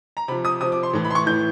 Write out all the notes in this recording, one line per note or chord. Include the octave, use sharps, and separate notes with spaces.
A#5
C3 F3 B5
D#6
C3 F3 D#6
D6
C6
A2 E3
B5
C6
C#6
A2 E3 G6